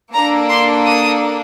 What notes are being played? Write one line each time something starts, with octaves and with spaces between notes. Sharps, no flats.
A#3 D4 A4 A#5
C6
D#6